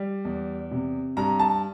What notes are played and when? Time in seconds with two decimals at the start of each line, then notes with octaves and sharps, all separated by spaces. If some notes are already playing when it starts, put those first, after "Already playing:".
Already playing: G3
0.25 E2
0.71 C3
1.17 G2 A#5
1.39 A5